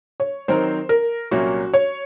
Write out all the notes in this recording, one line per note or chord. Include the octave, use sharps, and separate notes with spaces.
C#5
D#3 F#3 C4 D#4 A#4 C5
A#4
C2 A#2 F#3 A#3 C#4 F#4
C#5